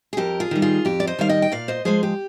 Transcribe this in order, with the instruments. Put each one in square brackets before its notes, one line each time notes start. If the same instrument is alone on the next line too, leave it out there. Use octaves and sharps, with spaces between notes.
[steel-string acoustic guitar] G#4
F2 G4 A#4
F4 G#4
D#3 G3
F4 G#4
F2 G4
D5
C5 D#5
D#3 G3 F5
D#5 G5
G5
A#2 D5 F5
C5 D#5
F3 G#3 G#4 C5
G4